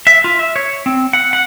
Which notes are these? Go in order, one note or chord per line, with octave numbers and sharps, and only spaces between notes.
E5
F4
E5
C#5
C4
F#5
F#5